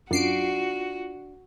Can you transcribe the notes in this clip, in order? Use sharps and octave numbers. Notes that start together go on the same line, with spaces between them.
F#2 D4 F4 F#4 C7 D7